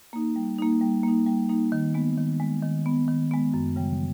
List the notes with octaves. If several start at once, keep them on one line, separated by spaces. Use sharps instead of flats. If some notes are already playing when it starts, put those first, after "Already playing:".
A#3 D#4
G3
A#3 D#4
G3
A#3 D#4
G3
A#3 D#4
D#3
G#3 B3
D#3
G#3 B3
D#3
G#3 B3
D#3
G#3 B3
F#2
C#3 E3 G3